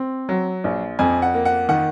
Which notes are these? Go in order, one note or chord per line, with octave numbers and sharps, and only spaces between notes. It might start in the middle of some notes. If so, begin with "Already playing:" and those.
Already playing: C4
F#3
A#1
F2 G#5
F#5
A#3
F#5
D#3 F#5